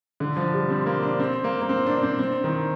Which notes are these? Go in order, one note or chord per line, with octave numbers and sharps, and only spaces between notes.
D3
F3
G3
C4
A#3
D4
C4
A#3
A#3
C4
D4
C4
C4
D#3